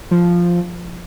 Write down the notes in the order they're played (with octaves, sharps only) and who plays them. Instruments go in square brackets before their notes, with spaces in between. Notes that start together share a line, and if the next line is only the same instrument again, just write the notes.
[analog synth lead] F3